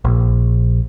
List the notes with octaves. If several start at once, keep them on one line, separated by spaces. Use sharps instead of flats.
A#1